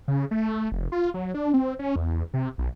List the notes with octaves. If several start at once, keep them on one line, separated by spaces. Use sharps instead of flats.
C#3
A3
F1
F4
F#3
D4
C4
C#4
E2
C3
B1